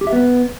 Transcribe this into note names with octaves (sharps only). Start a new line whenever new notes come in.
G4
E5
B3